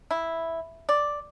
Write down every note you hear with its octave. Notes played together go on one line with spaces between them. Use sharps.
E4
D5